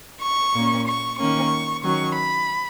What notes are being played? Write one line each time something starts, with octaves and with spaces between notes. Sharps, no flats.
C#6
A#2 A#3 C#4
C#6
D#3 A#3 C#4 C#6
D#3 F#3 C#4 C#6
B5